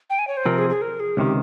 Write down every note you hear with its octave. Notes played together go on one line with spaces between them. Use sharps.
G5
G#5
C#5
C5
C3 F3 C4 A#4
G#4
G#4
A#4
G#4
C#2 C3 D#3 G4